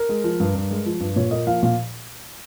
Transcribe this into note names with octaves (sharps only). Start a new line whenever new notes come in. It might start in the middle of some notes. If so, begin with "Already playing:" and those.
Already playing: A#4
G#3
F3
G2
G2
G#3
F3
G2
A#2 C#5
A#3 D#5
F3 F5
A#2 F5